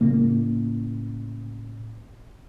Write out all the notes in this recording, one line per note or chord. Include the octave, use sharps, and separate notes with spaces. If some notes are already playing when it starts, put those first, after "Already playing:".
A2 C#3 A#3